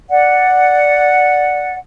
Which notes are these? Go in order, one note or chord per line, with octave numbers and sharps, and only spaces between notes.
D5 F#5